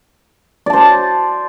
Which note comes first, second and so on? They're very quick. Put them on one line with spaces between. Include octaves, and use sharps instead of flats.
D5 A5 C5